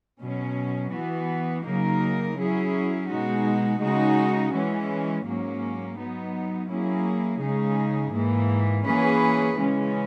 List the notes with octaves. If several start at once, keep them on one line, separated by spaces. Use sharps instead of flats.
B2 F#3 C#4
E3 B3 F#4
C#3 F#3 A#3 D#4 A#4
F#3 C#4 E4 G#4
B2 G#3 D#4 F#4
C#3 G#3 D#4 F#4
E3 G#3 C#4
G#2 F#3 A#3 C#4
F#3 B3 D#4
F#3 A#3 C#4 E4 G#4
C#3 G#3 D#4 G#4
G#2 E3 A#3
E3 A#3 C#4 G#4 B4
C#3 E3 G#3 C#4